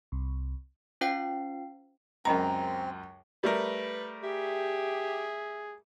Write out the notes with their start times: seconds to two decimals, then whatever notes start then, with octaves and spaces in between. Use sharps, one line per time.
0.12 C2
1.01 C#4 F4 C5 F5 G5 C7
2.25 C#2 F#2 C4 A#4 D#5 A#5 B5
3.44 G3 A3 A#4 B4
4.24 G4 G#4 E5